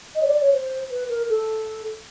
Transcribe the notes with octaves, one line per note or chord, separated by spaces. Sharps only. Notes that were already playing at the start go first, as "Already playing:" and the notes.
D#5
C#5
D5
C#5
C5
B4
A#4
A4